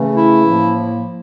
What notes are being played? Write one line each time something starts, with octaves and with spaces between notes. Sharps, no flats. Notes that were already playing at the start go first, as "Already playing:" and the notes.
Already playing: C#3 E3 A3 C#4
E4
A2 F3 A#3